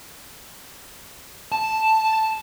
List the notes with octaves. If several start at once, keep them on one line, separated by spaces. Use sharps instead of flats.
A5